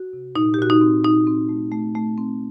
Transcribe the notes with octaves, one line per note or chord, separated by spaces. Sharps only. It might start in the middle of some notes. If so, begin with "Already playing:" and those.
Already playing: F#4
C3
A#2 D#4
G4
A#2 F#4
D#4
C4
A#2 D#4
C4
A3
A3
A3
C4